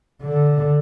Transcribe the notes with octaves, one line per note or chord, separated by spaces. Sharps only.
D3